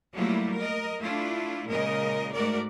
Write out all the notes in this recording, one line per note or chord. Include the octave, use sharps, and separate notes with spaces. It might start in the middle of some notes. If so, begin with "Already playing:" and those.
F#3 G3 A3 A#3 E4 F4
A#4 D#5
A3 D4 E4 F4
A#2 C#3 G#3 A#4 D#5
G#2 A3 F#4 A#4 D5